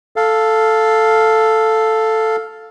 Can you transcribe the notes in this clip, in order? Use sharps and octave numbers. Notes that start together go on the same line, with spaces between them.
A4 F5